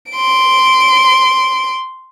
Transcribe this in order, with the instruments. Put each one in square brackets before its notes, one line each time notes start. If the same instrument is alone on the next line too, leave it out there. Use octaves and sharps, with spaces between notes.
[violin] C6 D7